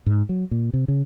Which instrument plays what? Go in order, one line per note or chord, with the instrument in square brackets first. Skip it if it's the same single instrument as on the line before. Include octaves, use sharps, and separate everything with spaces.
[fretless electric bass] G#2
F#3
A#2
C3
C#3